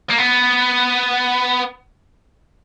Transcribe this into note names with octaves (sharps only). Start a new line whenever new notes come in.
A#3
B3